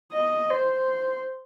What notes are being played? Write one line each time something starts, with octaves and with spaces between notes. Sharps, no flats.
D#5
C5